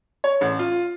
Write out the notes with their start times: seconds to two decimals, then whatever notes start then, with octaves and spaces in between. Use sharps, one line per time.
0.24 C#5
0.41 A1
0.59 F4